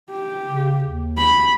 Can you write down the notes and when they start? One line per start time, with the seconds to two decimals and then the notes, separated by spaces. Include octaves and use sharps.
0.10 G4
0.46 C#3
0.84 D#2
1.18 B5